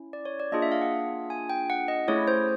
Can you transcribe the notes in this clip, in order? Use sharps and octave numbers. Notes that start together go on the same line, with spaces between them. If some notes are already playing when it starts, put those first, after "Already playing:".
Already playing: C#4 E4
D5
C#5
D5
A#3 D4 F4 G#4 D#5
E5
F5
F#5
G#5
G5
F#5
D#5
A3 C#4 E4 G#4 C#5
C5